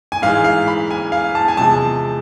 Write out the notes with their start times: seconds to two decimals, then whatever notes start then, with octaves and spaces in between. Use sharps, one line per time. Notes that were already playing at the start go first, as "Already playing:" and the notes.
0.12 G#5
0.22 G#2 E3 G#3 F5
0.44 F5
0.68 B5
0.91 G#5
1.12 F5
1.35 A5
1.48 G#5
1.57 E2 C3 F3 G#3 A5